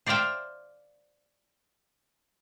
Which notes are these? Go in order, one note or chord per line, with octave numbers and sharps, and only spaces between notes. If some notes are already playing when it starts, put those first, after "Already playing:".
C5 D5 E5 F5 G5